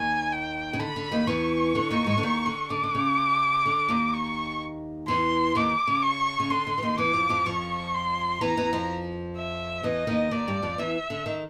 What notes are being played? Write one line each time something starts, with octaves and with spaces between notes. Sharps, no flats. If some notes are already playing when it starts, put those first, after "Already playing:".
Already playing: D#2 D#3 G#5
G5
C#3
D3 B5
D3
D#2 D#3
E2 E3 C#6
D3
D#2 D#3
G#2 G#3
D3
D#2 D#3
D3
D3 D6
D3
C#3
D3
D#2 D#3
C#6
E2 E3 C6
D#2 D#3 D6
C#3
C#6
C#3
D3 C6
D3
E3
D#2 D#3
E2 E3 D6
F2 F3
F2 F3
F2 F3 C#6
C6
E2 E3 A#5
E2 E3
F2 F3
E5
E2 E3 D#5
D#2 D#3
D#2 D#3 D5
G2 G3
F2 F3
E2 E3 E5
D3
D#3